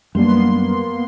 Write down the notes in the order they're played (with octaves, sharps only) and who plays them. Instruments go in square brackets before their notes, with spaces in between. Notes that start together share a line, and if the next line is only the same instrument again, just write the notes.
[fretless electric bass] F#2 G3 D4 [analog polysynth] A#3 B3 C6